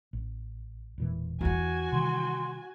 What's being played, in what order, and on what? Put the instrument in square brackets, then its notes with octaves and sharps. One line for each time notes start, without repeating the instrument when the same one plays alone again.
[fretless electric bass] A1
E1 A#2 E3
[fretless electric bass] E2 [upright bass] E3 E4 [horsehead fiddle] F#4 G#5
[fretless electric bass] C3 D#3 G3 [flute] C6